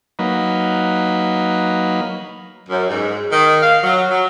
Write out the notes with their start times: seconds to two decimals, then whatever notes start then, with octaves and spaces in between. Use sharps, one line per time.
0.19 F#3 A#3 D#4 B4
2.69 F#2
2.89 G#2
3.32 D#3
3.62 F5
3.83 F#3
4.10 F#3